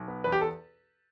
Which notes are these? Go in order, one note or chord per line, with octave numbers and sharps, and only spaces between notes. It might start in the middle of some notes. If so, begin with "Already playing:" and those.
Already playing: B1
B3
E2 B4
G4
A4